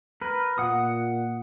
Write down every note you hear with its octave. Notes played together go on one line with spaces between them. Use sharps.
A#4 B4
A#2 F#5 D#6